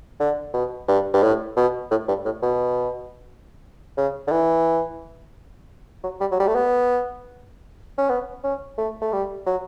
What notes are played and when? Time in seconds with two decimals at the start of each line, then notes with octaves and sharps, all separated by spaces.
0.19 D3
0.54 B2
0.88 G2
1.13 G2
1.22 A2
1.56 B2
1.91 A2
2.08 G2
2.25 A2
2.43 B2
3.97 C#3
4.27 D3
4.31 E3
6.03 F#3
6.20 G3
6.31 F#3
6.40 G3
6.47 A3
6.55 B3
7.97 C#4
8.09 B3
8.44 C#4
8.78 A3
9.01 A3
9.13 G3
9.46 F#3